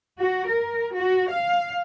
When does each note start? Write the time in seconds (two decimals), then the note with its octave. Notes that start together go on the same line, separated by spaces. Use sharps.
0.18 F#4
0.48 A#4
0.93 F#4
1.30 F5